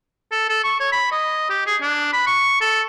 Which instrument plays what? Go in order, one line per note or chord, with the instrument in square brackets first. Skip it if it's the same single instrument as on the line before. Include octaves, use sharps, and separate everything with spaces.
[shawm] A4
A4
C#6
C#5
B5
D#5
G4
G#4
D4
B5
C#6
A4